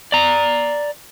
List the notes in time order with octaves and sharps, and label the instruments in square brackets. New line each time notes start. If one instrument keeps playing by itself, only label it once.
[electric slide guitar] D5 A#5